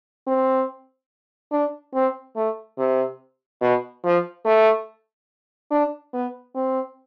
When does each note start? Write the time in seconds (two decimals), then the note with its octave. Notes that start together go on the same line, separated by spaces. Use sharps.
0.27 C4
1.52 D4
1.94 C4
2.36 A3
2.78 C3
3.61 B2
4.04 F3
4.45 A3
5.71 D4
6.13 B3
6.55 C4